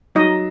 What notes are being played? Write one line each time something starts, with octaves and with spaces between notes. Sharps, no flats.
F#3 D#4 D#5